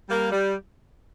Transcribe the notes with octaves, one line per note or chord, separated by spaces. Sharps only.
G3 A#3
G3